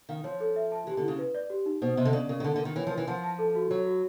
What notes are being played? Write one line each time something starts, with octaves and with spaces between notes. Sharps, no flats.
D#3 F5
F3 C#5
A4
E5
A5
E3 G4
D3
E4
C#3
B4
D5
G4
D#4
B2 C5
C3 D#5
D3
C#3 D5
C#3 A#4
D#3
D3 F#5
D3 A#4
D#3
E3 C#5
F3
A#4
E3
F3 F#5
A5
A4
F#4
F#3 C#5
F#4